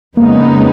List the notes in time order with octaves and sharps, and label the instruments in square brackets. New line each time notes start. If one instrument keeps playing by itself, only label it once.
[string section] F2 C#3 G#3 B3 D#4 [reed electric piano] A#3